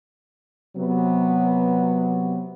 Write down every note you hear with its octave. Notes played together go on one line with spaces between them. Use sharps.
C3 F#3 B3